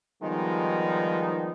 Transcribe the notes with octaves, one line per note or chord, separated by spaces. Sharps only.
D#3 F3 G3 G#3 B3 D#4